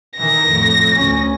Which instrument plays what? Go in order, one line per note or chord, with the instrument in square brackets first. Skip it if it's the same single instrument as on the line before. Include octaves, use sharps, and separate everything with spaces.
[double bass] D#3 E3 [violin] A#6
[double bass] F2 A2
D2 C#4